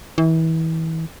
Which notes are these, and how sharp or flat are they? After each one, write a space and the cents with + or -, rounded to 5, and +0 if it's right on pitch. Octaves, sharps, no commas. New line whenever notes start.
E3 -30